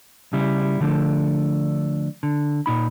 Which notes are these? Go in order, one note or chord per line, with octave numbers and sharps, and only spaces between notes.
C#3 G3 E4
D3 F3 A3 D4
D3
A#2 D#4 B5